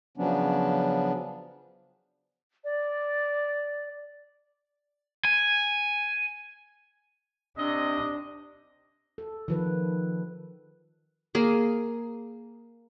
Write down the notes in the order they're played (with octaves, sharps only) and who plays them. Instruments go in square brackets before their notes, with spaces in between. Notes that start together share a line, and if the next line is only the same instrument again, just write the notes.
[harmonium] C#3 F3 F#3 B3 C#4 D4
[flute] D5
[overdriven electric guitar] G#5
[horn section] C3 D#5 [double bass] D4
[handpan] A4
D#3 F3 B4
[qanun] A#3 G#4